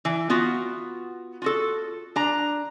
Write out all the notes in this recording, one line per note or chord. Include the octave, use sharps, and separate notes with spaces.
E3
B3 F4 F#4
F4 F#4 A4
D4 A#5